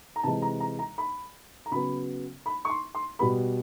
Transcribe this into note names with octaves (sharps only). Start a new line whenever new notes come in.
A#5
C3 E3 G#3 A5
A#5
A#5
A#5
B5
A#5
C#3 F#3 B3 B5
B5
C#6
C6
C6
B2 G3 B3 B5